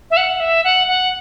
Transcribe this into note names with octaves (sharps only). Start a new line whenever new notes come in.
E5
F#5
E5
F#5
F#5